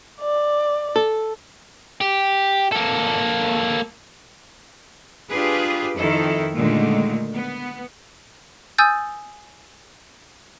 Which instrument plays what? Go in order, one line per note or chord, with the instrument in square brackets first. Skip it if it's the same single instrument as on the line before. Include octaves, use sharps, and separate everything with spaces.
[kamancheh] D5
[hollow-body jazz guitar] A4
[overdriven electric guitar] G4
A#3 A4
[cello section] D4 F4 G4 G#4 B4
F2 D#3 E4 A4
A#2 D3 D#3 G#3 A3
B3
[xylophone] G#5 D#6 E6 G6 A6